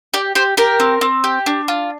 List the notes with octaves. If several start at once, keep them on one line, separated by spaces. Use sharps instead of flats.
G4 D5
G4 C5
G4 A#4
C4
C4
G4
D4
F4